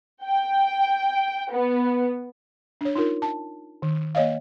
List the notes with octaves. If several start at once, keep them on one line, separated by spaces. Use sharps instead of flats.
G5
B3
D4 C#5
D#4 F4 A#4
A5
D#3
A#3 C#5 D#5 F5